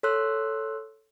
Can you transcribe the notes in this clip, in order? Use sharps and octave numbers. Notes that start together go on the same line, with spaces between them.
A4 C#5 C6 E6 F#6